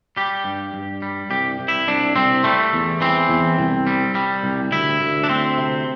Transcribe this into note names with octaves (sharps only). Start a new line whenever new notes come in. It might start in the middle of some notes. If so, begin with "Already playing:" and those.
G3 G4
G2
G2
G3
C2 G4
C2
E4
C2 D4
C2 C4
G3 A3
E2
E3 C4
E2
C2
G3
G3
C2
D2 E4
D2
D4
D2 C4
C3